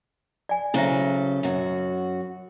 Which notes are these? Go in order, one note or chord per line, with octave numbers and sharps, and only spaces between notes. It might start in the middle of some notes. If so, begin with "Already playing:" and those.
D5 G#5
C#3 F#3 E4 A4 C5 E5
F#2 F#4